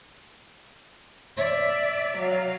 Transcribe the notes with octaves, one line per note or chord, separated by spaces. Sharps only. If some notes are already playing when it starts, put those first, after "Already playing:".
D5 E5
F#3 F5